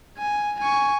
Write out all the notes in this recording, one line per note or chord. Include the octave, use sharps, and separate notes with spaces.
G#5
G#5 C#6